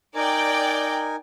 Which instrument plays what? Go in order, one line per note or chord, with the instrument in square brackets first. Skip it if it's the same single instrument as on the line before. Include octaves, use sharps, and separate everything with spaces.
[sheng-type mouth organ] D#4 A#4 G#5 [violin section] D5 G5